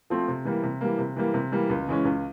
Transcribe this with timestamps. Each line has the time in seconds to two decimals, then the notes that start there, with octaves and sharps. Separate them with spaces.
0.10 F3 A3 C4 F4
0.28 C3
0.45 E3 G3 A#3
0.63 C3
0.81 E3 G3 A#3
0.99 C3
1.16 E3 G3 A#3
1.34 C3
1.52 E3 G3 A#3
1.70 C#2
1.88 C#3 E3 G#3 C#4
2.05 C#2